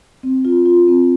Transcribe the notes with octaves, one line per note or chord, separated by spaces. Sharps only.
C4
F4
F4
C4